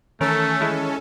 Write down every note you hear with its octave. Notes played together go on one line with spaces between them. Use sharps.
D#3 E3 A3 C#4 A4 A#4
G#3 E4